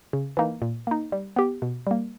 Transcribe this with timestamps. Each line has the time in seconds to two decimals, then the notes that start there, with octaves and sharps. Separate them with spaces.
0.13 C#3
0.37 E3 A#3 D#4
0.62 A#2
0.87 A#3 D#4
1.12 G3
1.36 B3 G4
1.62 B2
1.87 G3 A#3